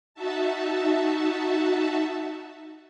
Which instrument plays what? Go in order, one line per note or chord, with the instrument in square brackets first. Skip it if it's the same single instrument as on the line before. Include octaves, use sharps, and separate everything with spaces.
[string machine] D#4 F#4 E5 A5